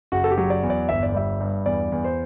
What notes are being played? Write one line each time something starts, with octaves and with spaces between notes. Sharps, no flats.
F#1 F#4
A4
G4
F#3
D5
E2
D5
G1 E5
D5
G3 E5
G2
E2 D5
E2
C5